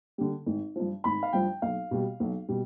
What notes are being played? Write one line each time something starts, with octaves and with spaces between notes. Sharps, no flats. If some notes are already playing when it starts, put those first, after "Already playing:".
D3 G3
G#1
G2 F3
G#1 B5
F5
G2 F3 G5
B1 F5
B2 G3
B1
B2 G3